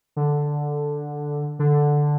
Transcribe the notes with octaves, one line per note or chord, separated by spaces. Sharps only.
D3
D3